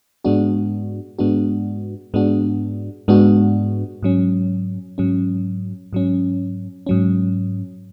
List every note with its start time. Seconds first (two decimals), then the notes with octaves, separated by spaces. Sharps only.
0.24 G#2 G#3 B3 D4 F#4
1.19 G#2 G#3 B3 D4 F#4
2.14 G#2 G#3 B3 D4 F#4
3.08 G#2 G#3 B3 D4 F#4
4.03 G#2 F#3 C#4
4.98 G#2 F#3 C#4
5.93 G#2 F#3 C#4
6.86 G#2 F#3 C#4